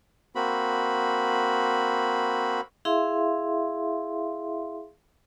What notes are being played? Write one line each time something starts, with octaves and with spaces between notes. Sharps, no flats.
A#3 C4 F#4 B5
E4 G#4 E5 F5 C6